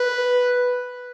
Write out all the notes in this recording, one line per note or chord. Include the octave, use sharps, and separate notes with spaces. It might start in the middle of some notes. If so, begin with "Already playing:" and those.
Already playing: B4